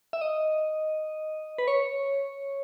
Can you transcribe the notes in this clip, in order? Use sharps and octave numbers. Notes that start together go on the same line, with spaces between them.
E5
D#5
B4
C#5